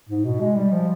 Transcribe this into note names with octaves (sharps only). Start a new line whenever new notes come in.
G#2
B2
G#3
G3
F3